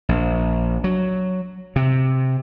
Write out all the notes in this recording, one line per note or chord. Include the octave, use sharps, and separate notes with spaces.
A#1
F#3
C3